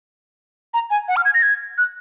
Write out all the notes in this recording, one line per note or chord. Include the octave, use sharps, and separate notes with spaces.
A#5
G#5
F#5
F6
G#6
A#6
G#6
F#6